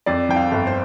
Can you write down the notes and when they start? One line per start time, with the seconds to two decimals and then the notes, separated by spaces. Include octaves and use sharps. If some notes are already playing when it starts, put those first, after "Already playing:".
0.06 F2 D5
0.29 F3 G5
0.36 F5
0.52 G1
0.67 C5